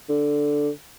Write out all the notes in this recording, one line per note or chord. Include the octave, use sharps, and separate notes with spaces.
D3